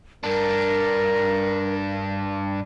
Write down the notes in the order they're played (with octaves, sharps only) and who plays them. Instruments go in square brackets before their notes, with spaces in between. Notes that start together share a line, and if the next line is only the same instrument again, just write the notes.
[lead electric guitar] G2 D4 [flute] A#4